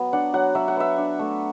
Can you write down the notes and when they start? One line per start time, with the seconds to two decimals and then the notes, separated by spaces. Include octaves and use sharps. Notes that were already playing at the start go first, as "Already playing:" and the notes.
Already playing: F#3 B3
0.13 D4 F#5
0.34 F#3 F#5
0.55 F#3 E5
0.68 F#5
0.76 B3 E5
0.98 D4
1.19 A3